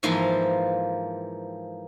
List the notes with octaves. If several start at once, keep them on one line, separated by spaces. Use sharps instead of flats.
G#2 E3 F3 A#3 B5 C6